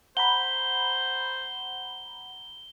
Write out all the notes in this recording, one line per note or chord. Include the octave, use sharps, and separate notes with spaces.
C5 F#5 A#5 B5 G7